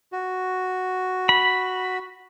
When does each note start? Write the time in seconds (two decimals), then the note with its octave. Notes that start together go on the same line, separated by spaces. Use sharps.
0.12 F#4
1.29 B5